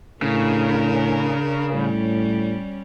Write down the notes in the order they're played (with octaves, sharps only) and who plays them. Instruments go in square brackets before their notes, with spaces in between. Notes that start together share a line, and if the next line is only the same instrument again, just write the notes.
[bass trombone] A2 [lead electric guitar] C#3 [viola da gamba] D4 A#4
[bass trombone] A2 [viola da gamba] G3 C#4